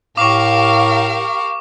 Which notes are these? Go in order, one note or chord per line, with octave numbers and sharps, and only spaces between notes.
A2 G4 A#4 F5 C#6 D6